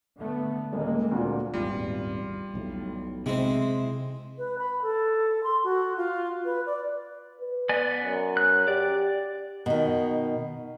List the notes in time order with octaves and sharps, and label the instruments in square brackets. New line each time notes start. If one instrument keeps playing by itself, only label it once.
[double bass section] D3 A3 B3
[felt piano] D#1 [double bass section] G#3 A#3
[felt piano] D2 A#2
[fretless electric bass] D#1 G#1 E2 [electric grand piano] G3 F4
[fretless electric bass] E1 B1 A2
[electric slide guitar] C3 E4 [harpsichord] G#3 C4
[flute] B4
B5
A4
C6
F#4
F4
B4
D5
[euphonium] B4
[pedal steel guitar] B3 D5 G#5
[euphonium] F#2
[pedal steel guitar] F#6
[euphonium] G4 [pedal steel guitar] D5
[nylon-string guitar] B2 D#3